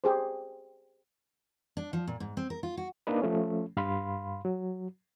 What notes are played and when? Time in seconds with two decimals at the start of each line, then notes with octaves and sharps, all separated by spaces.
0.04 G4 G#4 C5
1.77 D4
1.93 F3
2.07 A#2
2.20 G#2
2.37 C4
2.50 A#4
2.63 F4
2.77 F#4
3.07 A#3 D4 D#4 B4
3.22 F3 A3 C#4
3.77 G2 F5 B5 C6
4.45 F#3